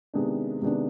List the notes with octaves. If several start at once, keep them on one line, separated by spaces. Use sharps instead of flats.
C3 D#3 G#3 B3 D4
C3 D#3 G#3 B3 D4